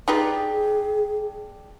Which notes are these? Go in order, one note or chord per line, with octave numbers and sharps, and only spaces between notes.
D4 D#4 F4 G4 G#4 B4